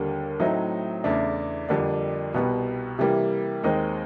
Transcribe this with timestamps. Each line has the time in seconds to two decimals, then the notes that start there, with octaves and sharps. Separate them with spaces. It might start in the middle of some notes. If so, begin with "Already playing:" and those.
Already playing: D#2 D3 G3 A#3
0.40 A2 F#3 A3 C4 D#4
1.04 E2 C#3 E3 A3 D4
1.69 F2 D3 G3 A#3 D4
2.34 C2 B2 G3 B3
2.99 C3 E3 G3 A#3
3.63 D#2 D#3 G#3 C4 D#4